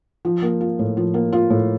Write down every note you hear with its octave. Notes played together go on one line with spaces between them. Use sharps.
F3
A#3
F4
A2
F3
A#3
F4
A2